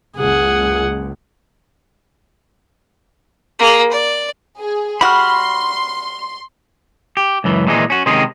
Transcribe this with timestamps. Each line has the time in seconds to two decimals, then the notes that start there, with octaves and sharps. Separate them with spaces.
0.17 F#1 C#2 G#4 F#5
3.59 A#3 G#4
3.91 D5
4.59 G#4
5.01 G3 F#4 B5 C6 F6
7.17 G4
7.44 C#2 F#2 E3
7.67 A#2 D#3 E3 G3 G#3 D#4
7.90 C#4 F#4
8.06 C3 D#3 G#3 C4 C#4 G#4